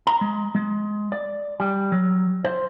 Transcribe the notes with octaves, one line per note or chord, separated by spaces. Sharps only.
A#5
G#3
G#3
D5
G3
F#3
C5